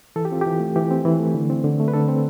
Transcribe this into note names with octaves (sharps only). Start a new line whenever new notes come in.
E3 A4
G4
C4 F4
E3 G4
A3
E3 G4
C4
E3
A3
D3
C4
D3
A3
B4
D3 A4
C4